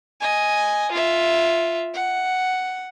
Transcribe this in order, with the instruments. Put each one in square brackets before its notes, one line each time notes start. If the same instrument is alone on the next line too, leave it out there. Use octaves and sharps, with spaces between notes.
[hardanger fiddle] D#5 G#5
F4 E5
F#5